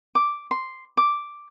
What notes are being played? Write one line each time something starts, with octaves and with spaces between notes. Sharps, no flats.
D6
C6
D6